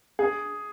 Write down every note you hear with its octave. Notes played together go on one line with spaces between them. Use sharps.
G#4